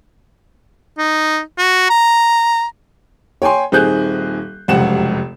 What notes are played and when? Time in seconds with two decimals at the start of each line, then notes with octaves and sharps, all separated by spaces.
0.98 D#4
1.58 F#4
1.90 A#5
3.42 C#5 G5 G#5 C6
3.72 D#1 C4 D#4 G#4 F#6 G6
4.68 F1 C#2 F#2 C3 F#5 E7